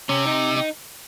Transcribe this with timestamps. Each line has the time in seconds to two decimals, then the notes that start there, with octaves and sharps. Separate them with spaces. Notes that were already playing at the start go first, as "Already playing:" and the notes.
0.09 C3 C#4
0.27 D#4
0.56 D#4